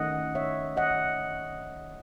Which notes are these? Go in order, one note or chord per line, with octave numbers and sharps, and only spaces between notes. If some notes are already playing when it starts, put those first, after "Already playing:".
Already playing: D#3 A3 C#4 D#5 F#5
C#5 E5
D#5 F#5